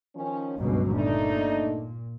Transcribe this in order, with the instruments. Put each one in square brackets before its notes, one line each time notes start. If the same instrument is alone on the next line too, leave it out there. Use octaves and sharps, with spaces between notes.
[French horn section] D#3 F3 C#4
[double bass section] G1 C#2 B2 [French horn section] F#3
[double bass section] A#2 [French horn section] A3 D4 D#4